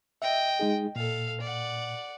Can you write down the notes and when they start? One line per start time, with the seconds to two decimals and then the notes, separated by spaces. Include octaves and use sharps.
0.22 D#5 E5 G5
0.59 G#3 D#4 G#4
0.96 A#2 A4 F5
1.41 D5 F#5